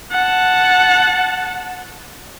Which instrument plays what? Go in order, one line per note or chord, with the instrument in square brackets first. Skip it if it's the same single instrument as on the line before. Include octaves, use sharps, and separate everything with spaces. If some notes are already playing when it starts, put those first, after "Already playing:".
[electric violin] F#5 A5